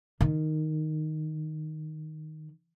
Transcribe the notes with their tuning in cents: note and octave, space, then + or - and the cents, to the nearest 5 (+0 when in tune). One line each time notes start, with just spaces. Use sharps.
D#3 -5